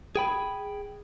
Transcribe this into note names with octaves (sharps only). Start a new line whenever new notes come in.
G#4 G5 B5